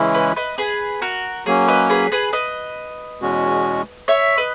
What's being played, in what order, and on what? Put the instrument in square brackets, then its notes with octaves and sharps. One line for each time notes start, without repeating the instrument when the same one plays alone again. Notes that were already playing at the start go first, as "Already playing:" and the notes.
Already playing: [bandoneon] C#3 E3 G#3 C#4 E4
[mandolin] B4 D#5
B4 D#5
G#4 B4
F#4 A#4
[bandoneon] F#3 A#3 C#4 [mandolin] G#4
[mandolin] B4 D#5
G#4 B4
G#4 B4
B4 D#5
[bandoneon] E2 B2 G#3 C#4 F#4
[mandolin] C#5 E5
B4 D#5